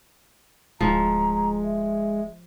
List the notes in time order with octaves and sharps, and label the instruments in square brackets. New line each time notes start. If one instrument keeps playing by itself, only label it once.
[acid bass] D1 [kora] F3 [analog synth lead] G#3 [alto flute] A#5
[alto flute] E5